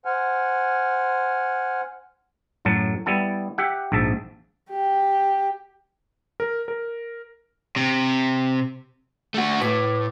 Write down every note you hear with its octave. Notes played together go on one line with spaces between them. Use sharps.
C5 F#5 G#5 F6
F#2 A2 F#3 A5
G3 B3 E4 A5
G4 E5 F#5
A#1 G#2 E5 A5
G4
A#4
A#4
C3
A3 F#4
A2 B4 D6